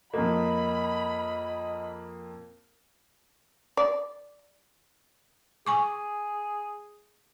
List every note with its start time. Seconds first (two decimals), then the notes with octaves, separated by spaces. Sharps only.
0.14 F2 A#3 D#5 B5
3.77 D5
5.67 G#4 G#5 C#6 D6